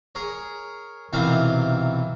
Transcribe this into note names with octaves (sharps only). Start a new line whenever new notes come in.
G#4 A#4 C#5
B1 C3 E3 F#3 A#4 F5